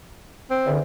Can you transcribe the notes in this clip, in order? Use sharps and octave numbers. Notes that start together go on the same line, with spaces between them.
C4
E2 D3